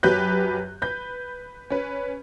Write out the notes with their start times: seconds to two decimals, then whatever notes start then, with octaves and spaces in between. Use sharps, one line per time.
0.03 F#2 F#3 G4 B4 F#6 G6
0.82 B4 G6
1.70 C#4 B4